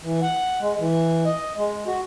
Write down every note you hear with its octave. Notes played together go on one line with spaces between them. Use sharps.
E3
F#5
G#3
E3
D#5
G#3
F#4